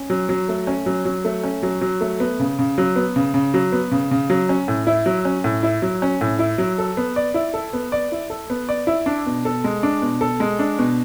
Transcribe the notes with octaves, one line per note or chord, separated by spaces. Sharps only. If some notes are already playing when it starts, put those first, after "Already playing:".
Already playing: C#4
F#3
F#3
A3
C#4
F#3
F#3
A3
C#4
F#3
F#3
A3
B3
C#3
C#3
F#3
B3
C#3
C#3
F#3
B3
C#3
C#3
F#3
C#4
A2
E4
F#3
C#4
A2
E4
F#3
C#4
A2
E4
F#3
A4
B3
D5
E4
A4
B3
D5
E4
A4
B3
D5
E4
D4
B2
A4
G#3
D4
B2
A4
G#3
D4
B2